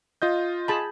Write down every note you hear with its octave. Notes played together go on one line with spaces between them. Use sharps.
F4 D#5 G6
G#4 A5 B5